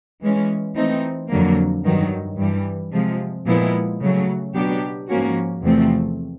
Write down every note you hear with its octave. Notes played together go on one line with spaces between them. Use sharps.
E3 G#3 C#4
E3 A3 C4 D#4
F2 D3 F#3 A#3
G2 D#3 F#3
G2 E3 G3
C3 F3 G#3
A#2 F3 G#3 B3 E4
C#3 F#3 A3
B2 F#3 B3 D4 G4
G#2 F3 A#3 C#4 F#4
E2 C3 F3 A3 C4